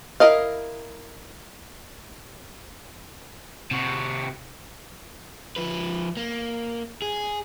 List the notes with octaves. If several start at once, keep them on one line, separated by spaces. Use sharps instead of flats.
E4 F4 A#4 D#5 F5
C3 F#4
F3 B4
A#3
G#4